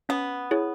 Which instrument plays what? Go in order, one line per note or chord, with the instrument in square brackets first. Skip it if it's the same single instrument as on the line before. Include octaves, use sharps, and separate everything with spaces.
[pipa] B3 [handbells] C#4
[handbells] E4 G#4 C#5